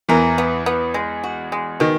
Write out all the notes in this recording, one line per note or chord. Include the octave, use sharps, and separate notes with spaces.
E2 E3 A#4
B3
B3
G#3
F#4
G#3
B2 D#3